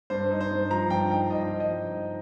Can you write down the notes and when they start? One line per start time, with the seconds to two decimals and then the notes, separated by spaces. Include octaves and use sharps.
0.10 G2 C5
0.31 D#4
0.41 C5
0.51 G2
0.71 F3 A#5
0.90 G2 G5
1.11 D#4 G5
1.30 G2 D#5
1.51 F3
1.60 D#5
1.71 G2
1.91 D#4